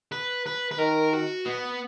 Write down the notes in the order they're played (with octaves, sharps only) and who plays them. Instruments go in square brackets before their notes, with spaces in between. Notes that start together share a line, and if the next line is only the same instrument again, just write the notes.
[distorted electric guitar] B4
B4
B4
[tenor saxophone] D#3 [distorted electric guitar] A#4
[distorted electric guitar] F#4
B3